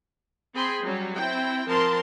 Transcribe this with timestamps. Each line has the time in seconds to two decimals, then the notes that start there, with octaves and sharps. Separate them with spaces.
0.54 C4 G#4 G5 B5 C6
0.82 F#3 G3 C#4
1.14 C4 E4 G5
1.67 F3 C4 A#4 A5 C6